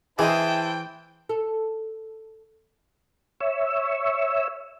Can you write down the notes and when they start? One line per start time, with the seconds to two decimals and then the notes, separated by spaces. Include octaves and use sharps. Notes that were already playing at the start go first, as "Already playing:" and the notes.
0.19 E3 E4 G#4 C5 D#5 G5 A5
1.29 A4
3.40 C#5 E5